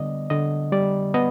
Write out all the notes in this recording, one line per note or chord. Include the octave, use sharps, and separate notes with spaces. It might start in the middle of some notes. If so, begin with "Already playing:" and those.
Already playing: D3 G3 B3 D5 D#5
D3 D#5
G3 D5
B3 D#5